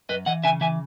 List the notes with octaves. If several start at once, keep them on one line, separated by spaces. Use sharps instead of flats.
F#2 B4 D#5
E3 D#5 F#5
C#3 E5 G#5
E3 E5 G#5